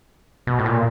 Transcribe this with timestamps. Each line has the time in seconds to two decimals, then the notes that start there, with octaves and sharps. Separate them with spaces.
0.47 B2
0.59 A2
0.66 A#2